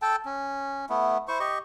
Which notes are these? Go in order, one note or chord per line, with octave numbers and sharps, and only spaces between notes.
A4 G5 A5
C#4
A3 B3 E4
E4 C5 C#6
G4 D#5 C#6